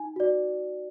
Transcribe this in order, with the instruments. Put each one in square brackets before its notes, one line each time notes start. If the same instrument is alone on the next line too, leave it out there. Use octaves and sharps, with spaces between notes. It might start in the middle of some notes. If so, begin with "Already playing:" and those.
Already playing: [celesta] D#4 G#5
F#4 D5